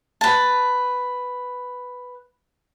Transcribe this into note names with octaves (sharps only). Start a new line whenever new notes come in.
B4 A5